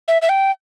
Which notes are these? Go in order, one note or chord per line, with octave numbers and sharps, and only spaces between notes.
E5
E5
G5